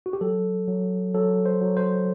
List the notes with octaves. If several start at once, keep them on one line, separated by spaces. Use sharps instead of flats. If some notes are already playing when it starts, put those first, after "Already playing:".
F#4
G4
F#3 A4
F#3
F#3 A4
C5
F#3
C5